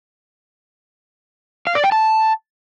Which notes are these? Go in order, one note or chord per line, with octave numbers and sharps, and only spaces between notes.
F5
D5
G5
A5